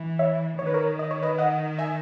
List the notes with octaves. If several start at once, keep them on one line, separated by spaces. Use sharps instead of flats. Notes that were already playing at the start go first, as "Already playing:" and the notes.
Already playing: E3
C#5 E5
D#3 C#5
B4
A#4 C#5
D#5
C#5
B4 D#5
D#5 F#5
E5 G#5